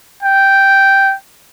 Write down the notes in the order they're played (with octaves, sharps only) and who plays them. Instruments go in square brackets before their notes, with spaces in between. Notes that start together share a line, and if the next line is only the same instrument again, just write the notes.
[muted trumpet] G5